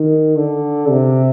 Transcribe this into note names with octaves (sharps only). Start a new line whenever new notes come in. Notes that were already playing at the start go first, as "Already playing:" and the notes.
Already playing: D#3
D3
C3